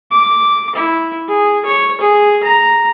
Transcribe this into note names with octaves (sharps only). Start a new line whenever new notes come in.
D6
E4
G#4
C#5
G#4
A#5